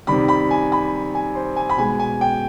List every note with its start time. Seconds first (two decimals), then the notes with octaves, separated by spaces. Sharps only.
0.07 C3 D#3 G3 B5
0.28 B5
0.51 G#5
0.72 B5
1.15 G#5
1.35 C5
1.56 G#5
1.70 B5
1.78 B2 G#3 G#5
1.99 G#5
2.21 G5